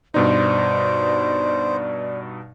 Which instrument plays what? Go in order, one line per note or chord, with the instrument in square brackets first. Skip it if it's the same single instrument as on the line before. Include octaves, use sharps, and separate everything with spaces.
[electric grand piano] G2 B2 D#4 [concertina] C5 [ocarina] D5